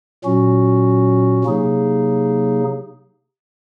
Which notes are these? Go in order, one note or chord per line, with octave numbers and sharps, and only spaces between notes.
A#2 F#3 C#4 F#4
C3 F#3 A#3 D#4 G#4